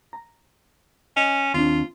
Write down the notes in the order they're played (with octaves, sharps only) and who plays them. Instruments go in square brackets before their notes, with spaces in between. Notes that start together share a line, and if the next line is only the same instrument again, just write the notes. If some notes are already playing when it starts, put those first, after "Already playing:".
[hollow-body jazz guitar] A#5
[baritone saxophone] C#4 [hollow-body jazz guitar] D#5
[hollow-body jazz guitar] D#2 C4 D4 [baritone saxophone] F4